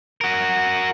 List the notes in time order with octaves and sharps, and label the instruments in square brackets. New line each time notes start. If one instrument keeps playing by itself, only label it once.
[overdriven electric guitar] F#4 A#4